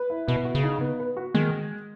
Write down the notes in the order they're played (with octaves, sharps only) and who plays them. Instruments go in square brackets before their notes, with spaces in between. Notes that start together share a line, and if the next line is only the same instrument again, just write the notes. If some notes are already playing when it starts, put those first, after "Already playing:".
Already playing: [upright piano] B4
E4
[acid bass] B2 [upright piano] B3
[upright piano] F#4
[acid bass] C#3
[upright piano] D#4
B3
B4
F#4
[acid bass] D#3 [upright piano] G#3